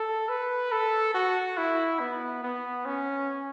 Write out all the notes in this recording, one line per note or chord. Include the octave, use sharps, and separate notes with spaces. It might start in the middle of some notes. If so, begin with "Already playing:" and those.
Already playing: A4
B4
A4
F#4
E4
B3
B3
C#4